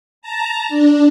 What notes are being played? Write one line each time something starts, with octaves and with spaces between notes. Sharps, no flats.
A5 A#5
D4